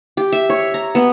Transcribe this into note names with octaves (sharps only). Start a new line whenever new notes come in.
G4
E5
C#5
A#5
B3